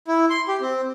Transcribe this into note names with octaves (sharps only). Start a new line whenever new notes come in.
E4
C6
G4
C4